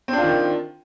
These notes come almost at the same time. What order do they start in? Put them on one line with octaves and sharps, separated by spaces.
C4 D4 F4 D#3